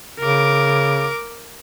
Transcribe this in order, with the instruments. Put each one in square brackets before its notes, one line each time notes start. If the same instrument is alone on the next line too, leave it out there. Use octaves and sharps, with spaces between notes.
[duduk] C#3 [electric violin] A#4 D6